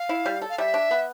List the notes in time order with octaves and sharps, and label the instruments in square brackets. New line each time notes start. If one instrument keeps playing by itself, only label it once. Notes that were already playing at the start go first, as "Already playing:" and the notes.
Already playing: [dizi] F5
[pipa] E4
G3
A4
[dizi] F5
[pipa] G3 [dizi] E5
[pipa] D4
B3